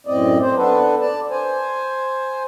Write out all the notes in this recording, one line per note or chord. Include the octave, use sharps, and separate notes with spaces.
F#2 A2 C4 D5 D#5
C4 C5
B3 D4 A4 B4
D5 A5
C5 G#5